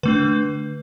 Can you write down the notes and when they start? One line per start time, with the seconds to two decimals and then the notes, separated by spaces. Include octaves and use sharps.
0.03 D3 A3 D4 B4